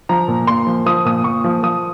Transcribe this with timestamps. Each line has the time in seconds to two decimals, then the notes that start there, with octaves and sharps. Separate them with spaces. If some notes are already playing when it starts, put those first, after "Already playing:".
0.09 F3 A#5
0.28 A#2
0.47 A#2 C6
0.67 F3
0.86 F3 D#6
1.05 A#2 D#6
1.24 A#2 C#6
1.44 F3
1.63 F3 D#6